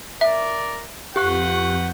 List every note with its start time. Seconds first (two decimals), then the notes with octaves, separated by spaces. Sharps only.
0.21 A#4 D5 E5
1.16 F2 G4 B4 F#5 C#6 F#6 G6